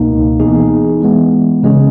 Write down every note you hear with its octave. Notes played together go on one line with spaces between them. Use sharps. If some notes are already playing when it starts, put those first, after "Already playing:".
Already playing: C#2 B2 A#3 D#4
E3 B3 D#4 G#4
E3 G#3 B3
C#3 G#3 C#4 G#4